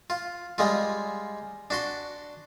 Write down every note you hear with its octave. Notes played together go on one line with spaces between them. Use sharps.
F4
G3 G#3 F4
D4 F#4 C6